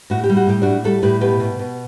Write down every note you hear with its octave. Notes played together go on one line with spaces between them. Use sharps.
A2 F#4
G4
G3
F#4
A2 G4
A2 D4 F#4
G3 F#4 A4
A2 G4 B4
B2 G4 B4
B2
B2